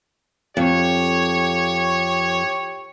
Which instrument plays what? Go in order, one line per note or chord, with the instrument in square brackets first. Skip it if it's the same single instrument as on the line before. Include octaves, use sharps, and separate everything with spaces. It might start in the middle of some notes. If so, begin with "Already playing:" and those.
[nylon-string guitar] F2 [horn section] G4 C#5